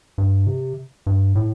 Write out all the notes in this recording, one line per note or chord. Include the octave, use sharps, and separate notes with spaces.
G2
C3
G2
A2